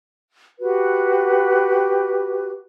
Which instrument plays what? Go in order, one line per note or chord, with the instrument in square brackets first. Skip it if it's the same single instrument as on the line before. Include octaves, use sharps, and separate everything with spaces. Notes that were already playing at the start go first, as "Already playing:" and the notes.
[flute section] F#4 G4 B4